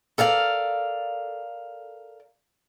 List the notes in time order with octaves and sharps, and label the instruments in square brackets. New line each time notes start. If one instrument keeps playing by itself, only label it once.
[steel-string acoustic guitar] A4 A#4 D5 F5